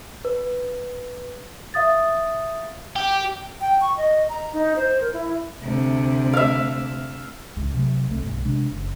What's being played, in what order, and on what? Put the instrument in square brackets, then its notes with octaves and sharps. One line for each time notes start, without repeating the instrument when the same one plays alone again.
[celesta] B4
E5 F5 D#6 A6
[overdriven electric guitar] G4
[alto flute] G5
C#6
D#5
A#5
D#4
C5
A#4
E4
[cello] D2 C3
[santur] E5 F5
[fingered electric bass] C#2 G#2
C3 F#3 A3
C2 A3
B1 G2
C3 G#3 D4
F#1